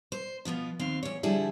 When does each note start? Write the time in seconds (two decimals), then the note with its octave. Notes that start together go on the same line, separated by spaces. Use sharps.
0.12 C5
0.45 B2 F3 B3 F4
0.79 D#2 C4 F5
1.03 E2 C#5
1.23 D3 F3 G3 E4 G#4